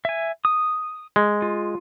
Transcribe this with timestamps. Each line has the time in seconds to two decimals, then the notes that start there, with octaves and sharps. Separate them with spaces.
0.05 E5 G#5
0.45 D#6
1.16 G#3
1.42 F4